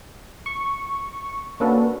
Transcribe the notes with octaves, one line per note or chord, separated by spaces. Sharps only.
C#6
A#3 C#4 D4 F#4 A4 B4